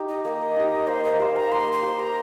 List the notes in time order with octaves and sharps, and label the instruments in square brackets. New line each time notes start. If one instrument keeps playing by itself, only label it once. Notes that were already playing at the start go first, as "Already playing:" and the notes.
Already playing: [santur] D#4 G4
[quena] D#5
[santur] A#3 [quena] D#5
[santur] D#4 G4
[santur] A#3 [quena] C5
[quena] D#5
[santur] G4 C5 [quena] F5
[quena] A#5
[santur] A#3 [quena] C6
[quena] C6
[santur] G4 C5
[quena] C6
A#5